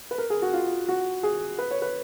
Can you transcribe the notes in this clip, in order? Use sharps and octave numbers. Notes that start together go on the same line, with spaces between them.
B4
A#4
G#4
F#4
F4
F#4
G#4
B4
C#5
B4